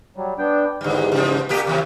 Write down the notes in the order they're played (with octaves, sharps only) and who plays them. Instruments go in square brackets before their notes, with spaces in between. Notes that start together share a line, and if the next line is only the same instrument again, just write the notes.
[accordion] F#3 G3
B3 D4 G5
[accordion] E2 G#2 [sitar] D3 G3
[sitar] C#3 F3
[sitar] A#2 B3 G4 [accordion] A#3
[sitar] D#2 C3 F#3